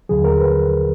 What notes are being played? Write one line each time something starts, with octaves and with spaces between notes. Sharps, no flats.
D#2 D3 F#3 G#4
A#4
B4